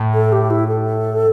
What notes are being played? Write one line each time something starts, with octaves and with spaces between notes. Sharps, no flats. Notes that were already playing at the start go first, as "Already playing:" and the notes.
Already playing: A2
A4
G4
E4
A4